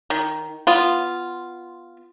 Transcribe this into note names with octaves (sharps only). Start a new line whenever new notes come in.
D#3
B3 F4